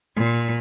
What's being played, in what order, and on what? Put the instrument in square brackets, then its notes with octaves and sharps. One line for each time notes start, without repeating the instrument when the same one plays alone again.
[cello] A#2